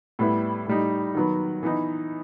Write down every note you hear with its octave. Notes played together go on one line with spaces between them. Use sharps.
A2 G3 B3 E4
A2 G3 D#4
D#3 F#3 B3
E3 B3 D#4